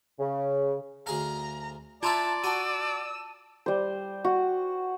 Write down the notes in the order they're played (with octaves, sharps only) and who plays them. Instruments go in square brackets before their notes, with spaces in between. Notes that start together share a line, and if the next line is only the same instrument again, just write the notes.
[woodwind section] C#3
[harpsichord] D2 G#4 F5 [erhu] A#5
[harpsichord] D4 E4 E5 [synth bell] F4 A#5 C6 [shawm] D5 [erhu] A5
[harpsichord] F#4 [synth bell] A5 D6 D#7 [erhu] E6
[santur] G3 C5
F#4